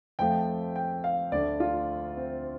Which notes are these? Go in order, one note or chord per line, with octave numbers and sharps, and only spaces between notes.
F2 F3 A3 G5
G5
F5
D2 D3 A3 D5
F4
C4